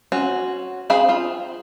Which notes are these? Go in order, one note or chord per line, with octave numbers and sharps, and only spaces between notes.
C4 C#4 F#4
C4 G#4 C5 F5 B5
C4 F4